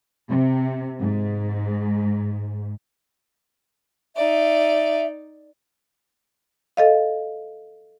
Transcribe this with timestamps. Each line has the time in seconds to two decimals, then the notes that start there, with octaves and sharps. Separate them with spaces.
0.29 C3
1.00 G#2
4.16 D#4 D5 E5
6.77 A4 D#5 F5